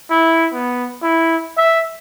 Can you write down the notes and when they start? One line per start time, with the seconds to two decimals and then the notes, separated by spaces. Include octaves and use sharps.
0.10 E4
0.53 B3
1.02 E4
1.58 E5